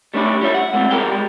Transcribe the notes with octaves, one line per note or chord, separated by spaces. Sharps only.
G3 A3 C#4 D4 E4 G4
G3 F4 C#5 E5
F#5
G#3 A3 C4 F4
B1 G3 F4 G#4 A#4 G5
G3 G#3